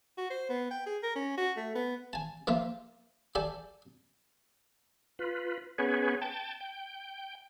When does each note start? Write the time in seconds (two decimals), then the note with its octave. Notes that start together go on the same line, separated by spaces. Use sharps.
0.17 F#4
0.30 C5
0.49 B3
0.71 G5
0.86 G#4
1.03 A#4
1.16 C#4
1.38 F#4
1.57 A3
1.75 B3
2.13 G#5 A5
2.47 F3 A#3 F4 E5
3.35 G4 A4 D5 G#5 A5
5.19 F4 B4
5.78 B3 C#4 G#4 B4 C#5
6.22 G5 A5
6.61 G5